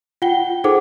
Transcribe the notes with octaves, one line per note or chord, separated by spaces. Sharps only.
F4 F#5 G5 G7
D#4 G#4 A4 C5 F#5 D6